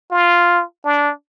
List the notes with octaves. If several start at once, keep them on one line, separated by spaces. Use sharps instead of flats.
F4
D4